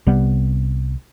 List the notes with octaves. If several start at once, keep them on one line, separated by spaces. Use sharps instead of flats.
C2 C3 G3 B3